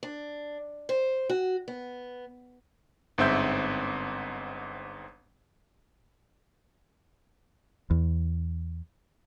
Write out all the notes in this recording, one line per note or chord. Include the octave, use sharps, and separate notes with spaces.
D4
C5
F#4
B3
G1 G#2 C4 E5 G6
E2